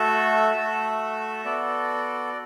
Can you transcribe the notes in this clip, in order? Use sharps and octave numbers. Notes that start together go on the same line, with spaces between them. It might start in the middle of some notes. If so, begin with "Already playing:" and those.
Already playing: A3 F#4 A4 E5
A3 F#4 A4
B3 F#4 A4 D5